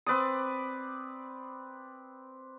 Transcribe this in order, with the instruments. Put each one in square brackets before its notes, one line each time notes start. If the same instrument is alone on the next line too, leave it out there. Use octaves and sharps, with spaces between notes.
[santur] C4 B4 D5 D#6